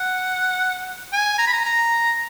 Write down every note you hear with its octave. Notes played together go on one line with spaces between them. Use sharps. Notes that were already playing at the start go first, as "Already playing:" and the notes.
Already playing: F#5
G#5
A#5
B5
A#5
A#5